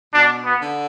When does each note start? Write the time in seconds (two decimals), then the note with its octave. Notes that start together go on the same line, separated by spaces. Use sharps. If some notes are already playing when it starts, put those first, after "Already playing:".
0.14 B2 D4
0.45 B3
0.61 D3